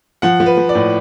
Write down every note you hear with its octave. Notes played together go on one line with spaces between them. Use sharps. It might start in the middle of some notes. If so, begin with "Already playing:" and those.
F3 F#5
F3
B4
F3
D5
A2